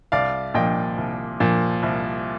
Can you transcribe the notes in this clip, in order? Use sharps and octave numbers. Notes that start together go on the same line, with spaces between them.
C2 D5 F5
A#2 F3 D#5 G5
C2
A#2 F3
C2